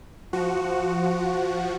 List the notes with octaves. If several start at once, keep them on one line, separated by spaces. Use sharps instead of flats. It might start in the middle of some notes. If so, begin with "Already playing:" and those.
F3 F#4